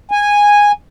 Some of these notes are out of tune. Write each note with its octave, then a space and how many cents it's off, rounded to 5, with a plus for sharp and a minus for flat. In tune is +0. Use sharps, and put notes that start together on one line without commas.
G#5 -10